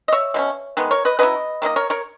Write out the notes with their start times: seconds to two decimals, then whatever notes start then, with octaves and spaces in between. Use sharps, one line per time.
0.08 D#5
0.12 C#5 E5
0.34 B2 A#3 C#4
0.77 D#3 G#3 B3
0.91 A#4 C#5
1.05 B4 D#5
1.19 F#3 C#4 E4 B4 D#5
1.62 D#3 A#3 E4 D#5
1.76 A#4 C#5
1.90 A#4 C#5